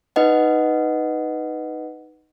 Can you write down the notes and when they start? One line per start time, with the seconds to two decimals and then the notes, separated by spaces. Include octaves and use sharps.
0.16 D#4 B4 D#5 F#5